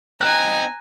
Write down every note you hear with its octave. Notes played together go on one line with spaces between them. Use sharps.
C4 D#4 G#5 A#5 F#6